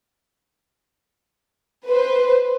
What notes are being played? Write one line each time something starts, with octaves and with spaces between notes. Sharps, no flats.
B4 C5